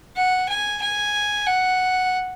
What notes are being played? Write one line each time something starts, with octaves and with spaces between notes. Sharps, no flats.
F#5
G#5
G#5
F#5